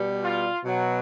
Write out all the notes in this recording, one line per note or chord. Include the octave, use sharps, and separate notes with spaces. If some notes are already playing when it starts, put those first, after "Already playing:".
Already playing: B2 G3
F4
B2 F#3